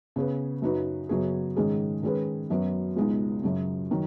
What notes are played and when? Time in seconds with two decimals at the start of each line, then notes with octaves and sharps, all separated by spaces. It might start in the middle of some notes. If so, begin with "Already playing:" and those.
0.16 C#3 B3 G#4 B4
0.62 F#2 F#3 D#4 F#4 B4
1.09 F#2 C#3 F#3 B3 G#4
1.56 G#2 D#3 G#3 C#4 G#4
2.02 D#3 G#3 C#4 G#4 B4
2.50 F#2 F#3 B3 F#4
2.96 C#2 B2 G#3 D#4
3.43 F#2 C#3 F#3
3.91 D#3 F#3